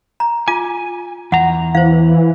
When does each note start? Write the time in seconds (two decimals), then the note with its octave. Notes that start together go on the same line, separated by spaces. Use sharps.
0.20 A#5
0.48 F4 G#5 D6
1.32 E2 F#5 A#5
1.75 E3 C5 F5